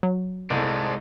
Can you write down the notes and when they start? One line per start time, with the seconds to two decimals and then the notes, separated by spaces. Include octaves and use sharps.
0.03 F#3
0.50 C2 G#3 A3 C4 D5 D#5 A5